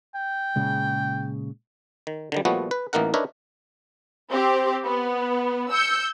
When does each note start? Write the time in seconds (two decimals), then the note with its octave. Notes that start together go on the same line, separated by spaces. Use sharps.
0.15 G5
0.56 A#2 C#3 G#3
2.07 D#3
2.32 D3 D#3 G3
2.45 A#2 F3 G3 A3 B3 F#4
2.71 B4
2.93 A1 E3 A#3 D#4 A#4 F#5
3.14 D4 D#4 A#4 B4 C#5 E5
4.30 C4 G4
4.84 B3
5.73 E6 G6 C#7